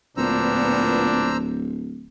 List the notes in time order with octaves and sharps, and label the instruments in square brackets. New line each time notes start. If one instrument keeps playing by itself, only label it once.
[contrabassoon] D1 [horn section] A#2 B3 [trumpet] D4 [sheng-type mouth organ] C5 A#5 E6